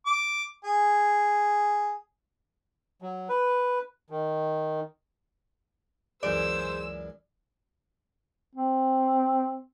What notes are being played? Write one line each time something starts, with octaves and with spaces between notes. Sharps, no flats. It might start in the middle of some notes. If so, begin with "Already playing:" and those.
D6
G#4
F#3
B4
D#3
C#2 F#2 E3 G#4 C5 D5 E6
C4